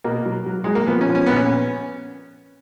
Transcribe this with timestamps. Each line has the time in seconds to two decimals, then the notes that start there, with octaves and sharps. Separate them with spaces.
0.04 B2 A#3
0.26 F#3
0.46 F#3
0.64 F#3 G#3
0.75 A#3
0.87 F3 B3
1.01 C#4
1.09 F3
1.15 C#4
1.26 A#2 B3
1.36 C#4